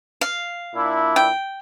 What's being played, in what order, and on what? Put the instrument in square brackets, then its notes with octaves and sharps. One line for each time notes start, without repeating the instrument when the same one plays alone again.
[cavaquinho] F5
[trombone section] A#2 D4 E4
[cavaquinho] G5